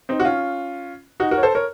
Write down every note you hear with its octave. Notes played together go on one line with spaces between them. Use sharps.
C4 D#4
F#4
C#4 F4
D#4 F#4
F#4 A#4
C#5
A4 C5
A#4 C#5